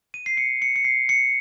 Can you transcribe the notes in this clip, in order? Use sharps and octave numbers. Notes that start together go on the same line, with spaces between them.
D#7
C7
C#7
C#7
C#7
C7
C#7